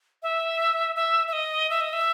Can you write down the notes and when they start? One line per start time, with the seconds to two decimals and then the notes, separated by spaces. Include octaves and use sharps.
0.23 E5
0.96 E5
1.28 E5
1.33 D#5
1.70 E5
1.81 D#5
1.93 E5